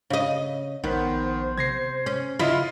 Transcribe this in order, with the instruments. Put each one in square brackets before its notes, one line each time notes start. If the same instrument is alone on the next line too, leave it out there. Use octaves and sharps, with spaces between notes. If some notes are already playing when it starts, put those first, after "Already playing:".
[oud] C#3 D#5
[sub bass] A#1 [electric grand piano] D#3 [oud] B3 [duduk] C5
[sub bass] C3 [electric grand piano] G#6 A#6 C7
[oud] C#4
[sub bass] C#3 [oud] E4 [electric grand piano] F4 D#5 F5